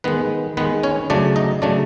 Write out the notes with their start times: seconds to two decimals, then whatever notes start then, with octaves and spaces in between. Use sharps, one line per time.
0.04 D#3 G#3 B3 B4
0.57 D#3 G#3 B3 B4
0.83 C#4 C#5
1.10 C#3 F#3 A3 D4 D5
1.36 D#4 D#5
1.62 C#3 F#3 A3 D4 D5